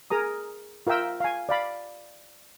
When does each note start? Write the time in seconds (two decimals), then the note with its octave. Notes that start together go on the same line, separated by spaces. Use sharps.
0.10 G#4 A#4 A#5 D#6
0.87 F4 A#4 E5 G5 E6
1.20 F5 G#5
1.49 D5 F5 B5